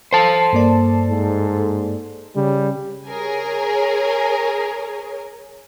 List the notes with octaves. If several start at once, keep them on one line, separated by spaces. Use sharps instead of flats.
A4 C5 A5
G2 A#3 D5
G#2
C#3 G3
G#4 A#4 C#5 G#5